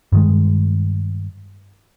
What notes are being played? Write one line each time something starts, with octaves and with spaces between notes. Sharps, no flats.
G2 D#3 G#3